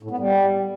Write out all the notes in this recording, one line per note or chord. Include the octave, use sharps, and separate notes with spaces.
A2
B3
G3